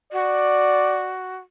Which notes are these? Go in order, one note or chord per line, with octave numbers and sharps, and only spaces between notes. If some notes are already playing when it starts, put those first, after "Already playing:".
F#4 D5